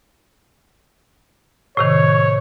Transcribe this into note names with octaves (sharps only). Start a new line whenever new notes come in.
A2 C3 D#3 C#5